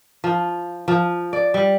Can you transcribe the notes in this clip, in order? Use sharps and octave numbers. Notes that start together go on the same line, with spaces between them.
F3
F3
D5
G3